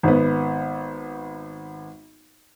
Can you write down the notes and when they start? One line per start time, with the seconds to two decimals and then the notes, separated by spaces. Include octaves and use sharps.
0.03 G#1 B3